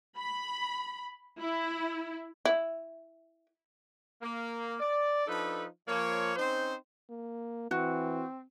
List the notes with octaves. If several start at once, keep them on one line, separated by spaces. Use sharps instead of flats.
B5
E4
E4
A#3
D5
F3 D4 D#4 A4 B4
F3 A#3 C#5
C4 C#4 D#4 C5
A#3
E3 C4 F#4